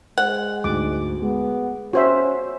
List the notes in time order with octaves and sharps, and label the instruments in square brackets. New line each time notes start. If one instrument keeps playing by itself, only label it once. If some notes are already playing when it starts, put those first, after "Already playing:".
[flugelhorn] G#3 [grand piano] C5 [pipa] F#5
[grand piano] D2 G#2 [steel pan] D6
[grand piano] G#3 [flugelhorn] B3
[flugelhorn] C#4 [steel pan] F#4 C5 E5